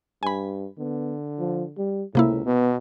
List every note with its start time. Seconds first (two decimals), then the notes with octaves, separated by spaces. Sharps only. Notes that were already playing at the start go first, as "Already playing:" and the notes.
0.23 G2 G#5 B5
0.79 D3 B3
1.39 F3
1.78 G3
2.15 C#2 A2 C3 A#3 E4
2.45 B2 B3